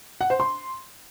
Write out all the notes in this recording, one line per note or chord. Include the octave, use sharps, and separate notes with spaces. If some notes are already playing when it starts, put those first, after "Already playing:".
F#5
C5
C6